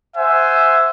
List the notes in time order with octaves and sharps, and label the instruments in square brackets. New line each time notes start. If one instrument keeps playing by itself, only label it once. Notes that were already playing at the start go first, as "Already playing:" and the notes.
[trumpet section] C5 E5 F#5 G#5